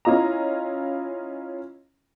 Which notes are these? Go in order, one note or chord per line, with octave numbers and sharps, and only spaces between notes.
C#4 E4 F4 D#5 A#5